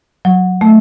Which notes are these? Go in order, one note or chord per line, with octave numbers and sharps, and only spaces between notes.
F#3
A3